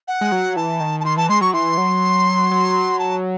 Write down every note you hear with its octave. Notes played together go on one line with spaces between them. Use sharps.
F#5
G#3
F#3
E3 A5
D#3
A5
D#3 C6
E3 A5
G#3 C6
F#3 C#6
E3 C6
F#3
F#3
A5